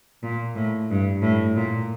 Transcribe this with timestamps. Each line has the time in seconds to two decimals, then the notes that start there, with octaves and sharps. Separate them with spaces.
0.23 A#2
0.55 A2
0.90 G2
1.22 A2
1.56 A#2